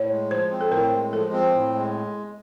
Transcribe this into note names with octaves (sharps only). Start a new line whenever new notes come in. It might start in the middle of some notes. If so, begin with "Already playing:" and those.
Already playing: A2 C#5
G#3
F3 C5
C4
A4
A2 A#4
G#3
F3 A4
C4
A2
G#3